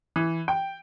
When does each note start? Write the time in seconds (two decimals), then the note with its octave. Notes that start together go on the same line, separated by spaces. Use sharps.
0.16 E3
0.48 G5